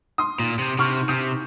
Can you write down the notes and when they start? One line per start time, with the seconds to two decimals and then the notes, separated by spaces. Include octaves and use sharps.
0.18 C6 D#6
0.40 A#2
0.59 C3
0.79 C3 C#6 F6
1.08 C3 D#6 G6